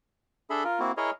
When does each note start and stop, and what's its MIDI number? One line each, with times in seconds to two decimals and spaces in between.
0.50 0.64 62
0.50 0.64 68
0.50 0.64 69
0.50 0.64 76
0.50 0.64 83
0.64 0.80 65
0.64 0.80 70
0.80 0.92 58
0.80 0.92 60
0.80 0.92 64
0.80 0.92 66
0.97 1.11 64
0.97 1.11 68
0.97 1.11 70
0.97 1.11 73
0.97 1.11 75